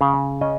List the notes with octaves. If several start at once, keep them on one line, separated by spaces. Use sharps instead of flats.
C#3 F5
C#4 D#5